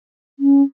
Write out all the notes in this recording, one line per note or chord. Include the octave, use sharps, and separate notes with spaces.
C#4